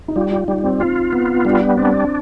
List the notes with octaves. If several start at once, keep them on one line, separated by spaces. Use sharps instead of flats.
D#4
G3 F4
F4
G3 D#4
C4
C4 F4
B3
G3 D4
C4 D4